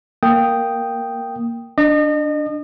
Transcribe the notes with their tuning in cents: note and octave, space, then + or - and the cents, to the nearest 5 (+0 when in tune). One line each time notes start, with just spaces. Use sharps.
A#3 -5 G5 +0 D#6 +0
D4 +0 D#5 -35